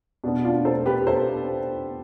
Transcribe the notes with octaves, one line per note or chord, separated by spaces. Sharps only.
B2 B3 D4
D4 F4
A4 C5
G4 B4
A4 C5